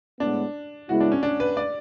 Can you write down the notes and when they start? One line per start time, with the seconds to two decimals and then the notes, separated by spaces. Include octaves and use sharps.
0.20 A2 G#3 B3 D4
0.89 C#3 G#3 B3 E4 F#4
1.00 D4
1.12 C#4
1.23 D4
1.40 B4
1.57 D5